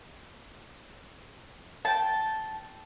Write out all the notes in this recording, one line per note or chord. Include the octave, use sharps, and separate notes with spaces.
G5 A5